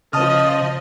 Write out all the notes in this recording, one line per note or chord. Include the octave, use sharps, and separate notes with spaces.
C#3 F3 D#5 A5 D#6 F6